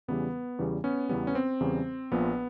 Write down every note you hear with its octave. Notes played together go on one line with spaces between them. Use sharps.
E2 C#3 E3 G3 B3
E2 C#3 E3 G3
B3 C#4
E2 C#3 E3 G3 B3
C#4
C4
E2 C#3 E3 G3
A#1 A#2 F3 B3